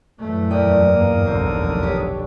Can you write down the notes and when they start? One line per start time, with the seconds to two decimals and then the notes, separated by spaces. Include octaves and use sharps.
0.19 F#2 A#2 E3 A3
0.50 E2 A#4 D5 G5 D#6
0.89 G2 A#3
1.25 F1 B1 D3 D#3 C4
1.83 G4 C#5